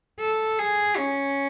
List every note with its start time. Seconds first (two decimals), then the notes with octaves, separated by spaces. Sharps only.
0.19 A4
0.59 G#4
0.96 C#4